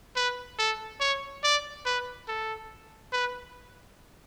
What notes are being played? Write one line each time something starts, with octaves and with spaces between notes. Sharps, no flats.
B4
A4
C#5
D5
B4
A4
B4